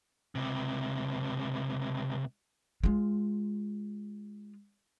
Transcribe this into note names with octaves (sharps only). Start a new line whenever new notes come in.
C#2 C3
G#3 F4